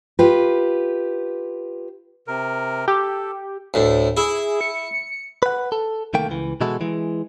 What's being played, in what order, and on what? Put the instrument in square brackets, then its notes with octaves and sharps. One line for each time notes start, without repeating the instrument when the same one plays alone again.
[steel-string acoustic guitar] F4 G4 B4
[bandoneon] C3 A#4
[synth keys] G4 [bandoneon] A4
[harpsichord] D2 A2
[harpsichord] E4 [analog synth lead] G#4
[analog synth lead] C#7
[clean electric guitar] B4 F#5
A4
C2 D#3 A3 A#3 G5
C#2 E3
B2 E3 G#3 E4 F#4 A4
E3 G#3